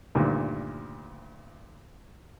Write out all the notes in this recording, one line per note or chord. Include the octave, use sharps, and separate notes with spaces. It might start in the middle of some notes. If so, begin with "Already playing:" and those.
D2 G2 A#2 D#3